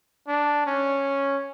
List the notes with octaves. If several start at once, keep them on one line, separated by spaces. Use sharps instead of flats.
D4
C#4